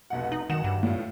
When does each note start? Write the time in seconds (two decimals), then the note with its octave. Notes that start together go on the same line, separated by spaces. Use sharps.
0.10 F1 B1 F#5
0.32 D#4 F#7
0.50 F#2 D#3 F#5 E7
0.64 G2
0.83 A2 F4